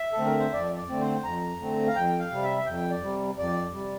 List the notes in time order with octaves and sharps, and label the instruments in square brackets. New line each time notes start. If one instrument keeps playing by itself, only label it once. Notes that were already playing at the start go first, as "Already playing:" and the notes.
Already playing: [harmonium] E5
A4
D3 A3 C4
A#4
C5
F2 D5
D5
D3 A3 C4
C5
F2 A#5
D3 A3 C4
F5
F2 G5
F5
C3 G3
E5
F2 G5
D5
C3 G3
F2 D5
C3 G3